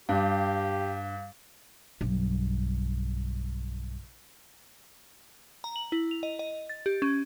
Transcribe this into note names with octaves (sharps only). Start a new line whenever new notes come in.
G2 G4 F5
B1 G2
A#5
F#7
E4
F7
D#5
D#5
A6
G4
C#4